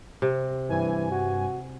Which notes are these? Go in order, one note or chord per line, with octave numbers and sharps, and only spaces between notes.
C3
G2 E3 G#5
F#4